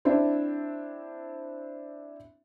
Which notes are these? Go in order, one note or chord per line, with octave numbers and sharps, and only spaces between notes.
C4 D4 E4